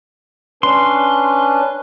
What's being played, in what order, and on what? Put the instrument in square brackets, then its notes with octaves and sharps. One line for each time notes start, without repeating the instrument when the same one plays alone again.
[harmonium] C#4 D4 B4 [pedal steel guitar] C6